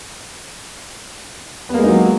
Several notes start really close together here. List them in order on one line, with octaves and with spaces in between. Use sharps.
B3 A#3 G#3 D#4 F#3